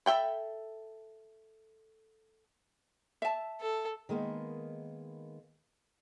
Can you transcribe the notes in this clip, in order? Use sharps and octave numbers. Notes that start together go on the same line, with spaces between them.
A4 E5 F5 G5 B5
E5 A5
A4
D#3 G#3 A#3 B3